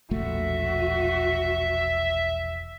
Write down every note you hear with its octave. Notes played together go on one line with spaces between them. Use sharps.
E1 A#1 A3 F#4 E5